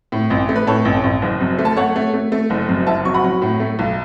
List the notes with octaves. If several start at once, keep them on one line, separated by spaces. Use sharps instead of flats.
A2
A1
A3
B4
A2 A4 C#5
A1
A1
F#1
F#2
A3
A5
A3 C#5 F#5
A3
A3
A3
F#1
F#2
F#1 E5 A5
F#3 C#6
F#5 B5
F#3
A2
A3
B1